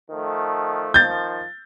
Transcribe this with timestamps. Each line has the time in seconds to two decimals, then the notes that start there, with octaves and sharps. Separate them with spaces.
0.10 D#3 F3 A3
0.94 D#3 F3 G6 A6